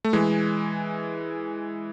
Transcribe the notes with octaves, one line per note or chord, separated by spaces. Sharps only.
A3
E3 G#3